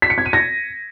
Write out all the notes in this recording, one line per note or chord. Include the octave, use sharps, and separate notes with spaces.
B6
C#7
G#6
D#7
A#6